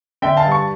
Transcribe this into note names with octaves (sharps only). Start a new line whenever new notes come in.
D3 E5 G5
F5 A5
G2
A5 C#6